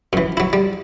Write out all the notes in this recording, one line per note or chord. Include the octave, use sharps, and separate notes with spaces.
F#2 E3
F#3 E4
G3